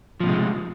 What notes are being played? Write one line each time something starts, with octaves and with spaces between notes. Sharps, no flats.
A2 C3 F3 G#3